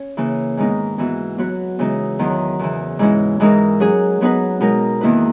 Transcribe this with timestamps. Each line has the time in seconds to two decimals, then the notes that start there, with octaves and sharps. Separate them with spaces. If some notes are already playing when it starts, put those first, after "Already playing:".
Already playing: C#4
0.17 C#3 E3 A#3
0.57 G#2 D#3 G#3 B3 D#4
0.98 G#2 E3 B3 F#4
1.38 F#3 B3 F#4 B4
1.79 C#3 E3 G#3 B3 D#4
2.19 E2 D#3 F#3
2.59 E2 C#3 E3
2.99 G#2 E3 G#3 C#4 E4
3.40 G#2 E3 G#3 D#4 A#4
3.80 F#3 C#4 G#4
4.21 F#3 B3 D#4 G#4 B4
4.60 B2 G#3 D#4 A#4
5.01 E2 D#3 A#3 E4 B4